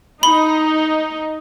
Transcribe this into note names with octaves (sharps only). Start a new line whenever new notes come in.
D#4 B5 G7